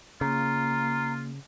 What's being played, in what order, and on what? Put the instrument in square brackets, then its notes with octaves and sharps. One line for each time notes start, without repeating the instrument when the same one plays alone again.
[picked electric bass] C#3 [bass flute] A#3 [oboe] F4 [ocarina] A#5